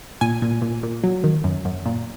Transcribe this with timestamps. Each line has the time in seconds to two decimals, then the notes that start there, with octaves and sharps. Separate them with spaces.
0.21 A#2 G#5
0.42 A#2
0.62 A#2
0.83 A#2
1.04 F#3
1.24 D#3
1.44 F#2
1.65 F#2
1.86 A#2